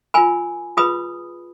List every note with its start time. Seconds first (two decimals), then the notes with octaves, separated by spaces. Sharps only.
0.14 F4 A#4 G#5 B5
0.77 F4 G#4 B4 B5 D#6